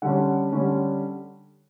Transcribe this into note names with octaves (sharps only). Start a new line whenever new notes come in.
D3 G3 C#4 F#5
D3 G3 C#4